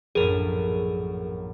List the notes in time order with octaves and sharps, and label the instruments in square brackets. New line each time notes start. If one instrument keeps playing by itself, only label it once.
[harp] A#1 F#2 A2 [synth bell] G#4 A#4